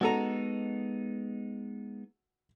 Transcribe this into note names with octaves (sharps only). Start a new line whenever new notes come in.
G#3 B3 D#4 F#4 A4 A#5